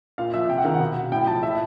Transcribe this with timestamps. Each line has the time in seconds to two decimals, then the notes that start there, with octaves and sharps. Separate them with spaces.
0.18 A#2 F5
0.34 F3 E5
0.49 C3 G5
0.58 F#5
0.65 D#3 F5
0.74 F#5
0.80 B2
1.12 A2 G5
1.27 F3 A5
1.43 A2 E5